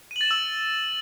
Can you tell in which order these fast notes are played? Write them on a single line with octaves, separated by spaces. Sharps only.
D#7 F#7 A6 E7 E6